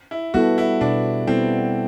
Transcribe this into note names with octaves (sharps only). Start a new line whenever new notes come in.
E4
G3 B3 E4 F#4 A4
E4
B2 D4
G3 B3 C4 E4 A4